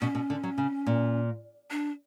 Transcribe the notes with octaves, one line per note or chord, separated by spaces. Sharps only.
B2 C#4
B2
D3
F#3
C#3
A#2
D4